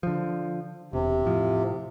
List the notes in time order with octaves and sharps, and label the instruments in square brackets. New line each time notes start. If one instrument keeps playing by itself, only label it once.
[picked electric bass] D3 F3
[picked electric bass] E1 [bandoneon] C3
[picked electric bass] A2 F3